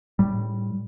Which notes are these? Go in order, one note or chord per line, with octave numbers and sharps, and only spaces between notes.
A2 G3